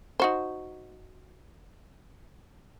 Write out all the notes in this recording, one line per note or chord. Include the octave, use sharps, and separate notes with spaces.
D#4 F#4 C5